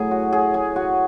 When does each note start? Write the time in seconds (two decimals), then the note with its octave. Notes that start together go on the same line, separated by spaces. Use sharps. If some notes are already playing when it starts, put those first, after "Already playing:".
Already playing: A2 F#3 G#4
0.11 F#4
0.33 G#4
0.54 G#4
0.76 F#4